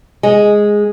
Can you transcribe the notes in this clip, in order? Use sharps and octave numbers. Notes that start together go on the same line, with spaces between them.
G#3